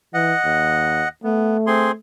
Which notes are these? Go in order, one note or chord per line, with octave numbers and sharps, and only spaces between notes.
E3 D#5 F#5
D#2
A3 B3
C4 G#4 C6